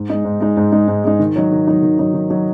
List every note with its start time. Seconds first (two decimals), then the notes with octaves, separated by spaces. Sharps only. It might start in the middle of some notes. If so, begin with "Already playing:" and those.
Already playing: G#2
0.10 G#3 D#4
0.25 G#2
0.40 G#3 D#4
0.57 G#2
0.72 G#3 D#4
0.88 G#2
1.04 G#3 D#4
1.20 D#3
1.36 F#3 D#4
1.52 D#3
1.67 F#3 D#4
1.82 D#3
1.99 F#3 D#4
2.14 D#3
2.30 F#3 D#4